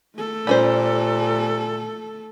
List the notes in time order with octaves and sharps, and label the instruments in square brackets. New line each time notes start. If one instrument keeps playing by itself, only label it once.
[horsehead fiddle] A3 A4
[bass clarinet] A#2 [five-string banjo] G3 C#4 C5